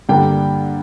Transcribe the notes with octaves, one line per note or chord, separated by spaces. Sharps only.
G2 D3 G3 A#3 D4 G5